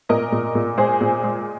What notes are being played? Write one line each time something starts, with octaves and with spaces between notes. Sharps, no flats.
A#2 A#4 D#5
A#2
A#2
G#3 G#4 C5
A#2
G#3